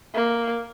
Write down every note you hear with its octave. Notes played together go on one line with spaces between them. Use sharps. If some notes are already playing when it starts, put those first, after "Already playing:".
A#3